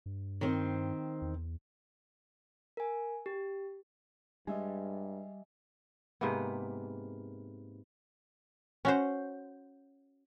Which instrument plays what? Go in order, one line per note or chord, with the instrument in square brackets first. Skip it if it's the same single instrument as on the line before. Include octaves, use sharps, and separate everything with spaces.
[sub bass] G2
[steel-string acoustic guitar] D#3 C4 C5
[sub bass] E2
[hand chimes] A#4 G#5
G4
[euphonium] G2 [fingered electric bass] G3 [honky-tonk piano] G#3 [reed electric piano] D#5 E5 G#5
[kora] G#2 C3 A#3 B3
[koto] C#4 F#4 C5